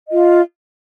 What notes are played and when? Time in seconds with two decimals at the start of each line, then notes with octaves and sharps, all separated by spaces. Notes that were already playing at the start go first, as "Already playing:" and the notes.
0.08 D#5
0.11 F4
0.15 F5